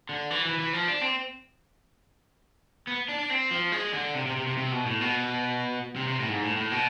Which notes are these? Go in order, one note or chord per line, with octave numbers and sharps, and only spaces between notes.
D3
E3
E3
E3
F3
D4
C4
B3
D4
D4
C4
F3
G#3
D3
C3
C3
C3
C3
C3
B2
A2
B2
C3
C3
A2
G#2
A2
A2
B2